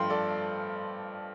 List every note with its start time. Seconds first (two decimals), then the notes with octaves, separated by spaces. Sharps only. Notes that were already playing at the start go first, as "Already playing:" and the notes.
Already playing: G2 F3 A3 F5 G5 C6
0.10 A4 D5